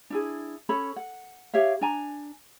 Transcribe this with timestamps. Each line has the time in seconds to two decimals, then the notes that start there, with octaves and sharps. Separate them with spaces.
0.10 D4 E4 G#4
0.69 C#4 A4 C#5 B5
0.96 F#5
1.54 G4 C#5 E5 F5
1.81 D4 G#5 A#5